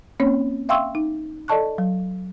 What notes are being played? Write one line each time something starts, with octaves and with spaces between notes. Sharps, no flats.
A#3 C4 C#4 C#5
E5 F5 G5 C6 C#6 E6
D#4
A4 D5 D#5 A5 C#6 F#6
F#3